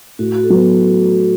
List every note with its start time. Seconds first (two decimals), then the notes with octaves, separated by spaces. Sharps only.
0.19 A2 F#4
0.35 F#4
0.43 A4
0.50 F#3 B3 F#4